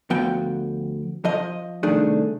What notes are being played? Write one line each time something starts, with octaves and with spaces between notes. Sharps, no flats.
D2 F3 B3 F#4 G5
F3 D#5
C2 D#3 A3 D4 G#4